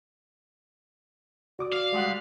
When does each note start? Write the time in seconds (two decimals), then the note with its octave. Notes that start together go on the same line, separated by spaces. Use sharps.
1.59 F#4 D5 D6 D#6
1.73 F5
1.92 G3 G#3 F#5